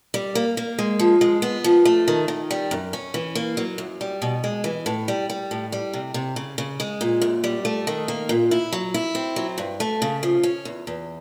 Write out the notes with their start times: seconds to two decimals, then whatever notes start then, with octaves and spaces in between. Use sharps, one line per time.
0.14 G3
0.35 A#3
0.57 A#3
0.79 G#3
0.99 F3
1.21 G#3
1.42 B3
1.64 F3
1.85 A3
2.08 D#3
2.28 D#3
2.51 G3
2.71 F#2
2.93 C#4
3.14 E3
3.35 A#3
3.57 F#3
3.78 F#2
4.01 G3
4.22 B2
4.44 G#3
4.64 E3
4.86 A2
5.08 G3
5.30 G3
5.51 A2
5.72 G3
5.93 C3
6.14 C3
6.36 C#3
6.58 C#3
6.80 G#3
7.01 A#2
7.22 F#2
7.44 G3
7.65 A3
7.87 D#3
8.08 A#3
8.29 A#2
8.51 E4
8.73 F#3
8.94 E4
9.15 C4
9.36 F#3
9.58 G2
9.80 A3
10.02 C#3
10.23 F3
10.43 C#4
10.65 E2
10.87 E2